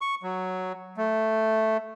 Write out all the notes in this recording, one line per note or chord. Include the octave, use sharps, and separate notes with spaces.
C#6
F#3
A3